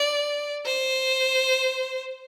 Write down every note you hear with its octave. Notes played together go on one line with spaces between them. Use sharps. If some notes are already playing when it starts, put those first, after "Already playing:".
Already playing: D5
C5